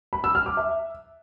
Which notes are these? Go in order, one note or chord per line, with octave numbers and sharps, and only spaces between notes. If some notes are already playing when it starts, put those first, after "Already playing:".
B5
E6
F6
D6
E5